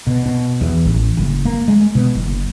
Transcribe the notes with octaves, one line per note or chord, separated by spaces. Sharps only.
B2
B2
E2
A1
F#1
A#3
G#3
B2
F#1